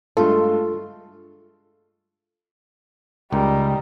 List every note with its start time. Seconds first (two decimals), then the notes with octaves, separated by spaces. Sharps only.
0.17 G2 G#3 A3 F4 A4
3.32 C#2 G3 D#4 A#4